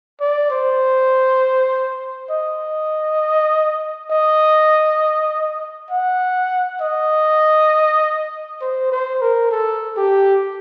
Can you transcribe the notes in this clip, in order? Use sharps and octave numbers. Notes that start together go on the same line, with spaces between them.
D5
C5
D#5
D#5
F#5
D#5
C5
C5
A#4
A4
G4